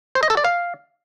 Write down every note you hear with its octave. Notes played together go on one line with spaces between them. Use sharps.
C5
D#5
A4
D5
F5